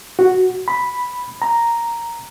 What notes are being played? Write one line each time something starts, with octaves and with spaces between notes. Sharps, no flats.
F#4
B5
A#5